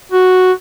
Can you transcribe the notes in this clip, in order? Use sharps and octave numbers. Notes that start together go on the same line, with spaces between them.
F#4